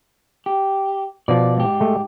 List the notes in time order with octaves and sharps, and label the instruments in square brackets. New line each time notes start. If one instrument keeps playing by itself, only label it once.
[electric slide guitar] G4
[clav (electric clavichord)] B2 F3 [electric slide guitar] D5
[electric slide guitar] G#2 G4
[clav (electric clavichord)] G#3 A3